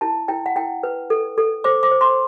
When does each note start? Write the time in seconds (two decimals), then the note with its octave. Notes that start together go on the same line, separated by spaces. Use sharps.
0.01 E4 A5
0.28 E4 G5
0.46 F#5
0.56 E4 G5
0.83 B4
1.10 A4
1.38 A4
1.64 C5 D6
1.83 D6
1.91 C5
2.01 C6